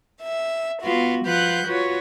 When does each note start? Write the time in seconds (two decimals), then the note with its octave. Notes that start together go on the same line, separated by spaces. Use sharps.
0.22 E5
0.82 B3 F4 F#4
1.24 F3 F4 B4 F#5 F#6 G6
1.65 F4 F#4 B4 C#5